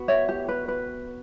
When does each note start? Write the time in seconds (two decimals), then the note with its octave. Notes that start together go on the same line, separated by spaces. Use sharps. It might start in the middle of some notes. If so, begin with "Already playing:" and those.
Already playing: B3 F#4
0.08 C#5 E5
0.29 G4
0.48 B4
0.68 B4